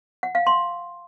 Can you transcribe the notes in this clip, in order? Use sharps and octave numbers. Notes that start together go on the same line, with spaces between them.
F#5
F5
C6